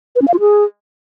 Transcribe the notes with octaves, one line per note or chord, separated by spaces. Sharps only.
B4
C#4
F5
F4
G#4